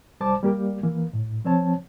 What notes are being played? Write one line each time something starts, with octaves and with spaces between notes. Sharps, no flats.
C2 G3 C5 A5 D6
G3 A#3 G4
E3 A#3
A2
F3 C4 C#5 A5